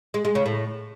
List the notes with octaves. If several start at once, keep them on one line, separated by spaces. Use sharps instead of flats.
G#3
G#3
C#3
A2